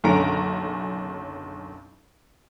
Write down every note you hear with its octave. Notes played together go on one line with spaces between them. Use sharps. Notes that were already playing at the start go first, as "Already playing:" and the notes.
F#1 B1 D3 C#4 A#5 D7